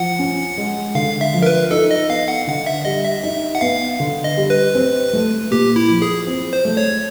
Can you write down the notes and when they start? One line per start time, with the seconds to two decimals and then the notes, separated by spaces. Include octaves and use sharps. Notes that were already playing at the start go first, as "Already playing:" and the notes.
Already playing: F3 F#5
0.19 C#4
0.58 G#3
0.95 D3 F5
1.21 E5
1.34 F3
1.42 A#4
1.46 B4
1.71 D#4 A4
1.91 D#5
2.09 B3 F5
2.28 F#5
2.47 D3 F#5
2.66 E5
2.85 G3 D#5
3.05 E5
3.23 D#4 E5
3.55 F#5
3.61 B3 F5
4.00 D3
4.24 D#5
4.37 G3
4.50 B4
4.75 C4
5.13 A3
5.51 A#2 G4
5.76 E4
5.90 F3
6.02 G#4
6.27 C4
6.53 C5
6.65 A3
6.77 C#5